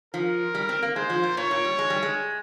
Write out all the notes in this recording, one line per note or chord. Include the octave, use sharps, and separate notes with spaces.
F3 A#4
G3
C4
A#3
G#3 C5
F3
A#2
A#2 C#5
A#2
G3
G#3
G3
G#3